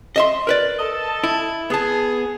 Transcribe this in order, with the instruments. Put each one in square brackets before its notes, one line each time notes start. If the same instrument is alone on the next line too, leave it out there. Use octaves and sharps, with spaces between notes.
[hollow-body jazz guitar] D#5 E5 C6
A#4 B4 D5
[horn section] A4 D#5 A5
[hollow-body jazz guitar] E4
[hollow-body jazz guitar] B3 A5 [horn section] G#4